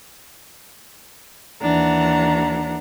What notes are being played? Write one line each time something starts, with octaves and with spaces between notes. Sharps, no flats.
D#2 E3 D4 F#5 A#5